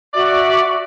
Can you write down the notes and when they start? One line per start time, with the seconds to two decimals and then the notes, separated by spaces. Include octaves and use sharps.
0.14 F#4 D5 E5